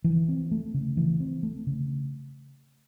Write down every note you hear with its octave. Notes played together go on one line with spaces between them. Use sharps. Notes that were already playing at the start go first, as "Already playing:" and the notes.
E3
C4
A3
C#3
E3
C4
A3
C#3